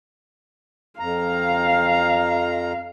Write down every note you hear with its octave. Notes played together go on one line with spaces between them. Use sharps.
F2 F5 A#5